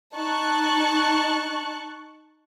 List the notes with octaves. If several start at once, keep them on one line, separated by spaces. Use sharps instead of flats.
D#4 A5 C#6 F#6